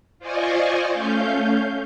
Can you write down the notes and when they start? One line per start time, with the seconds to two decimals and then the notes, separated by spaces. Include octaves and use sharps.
0.19 F4 C5 D5 D#5 G#5 C#6
0.92 A3 C#4 F5 G6